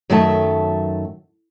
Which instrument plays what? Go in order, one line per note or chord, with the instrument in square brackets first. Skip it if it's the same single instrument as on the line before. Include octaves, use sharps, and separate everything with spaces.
[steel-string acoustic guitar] F#2 D#3 F#3 A3 E5 A5